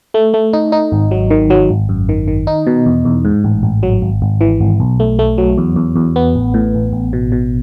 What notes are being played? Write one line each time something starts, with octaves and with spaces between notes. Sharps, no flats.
A3
A3
D#4
D#4
G#1
F#3
D#3
F#3
G#1
F#2
D#3
D#3
D#4
B2
E2
E2
G#2
A1
A1
F#3
G#1
G#1
E3
G#1
B1
A3
A3
F#3
E2
E2
E2
B3
A1
A2
A1
A1
B2
B2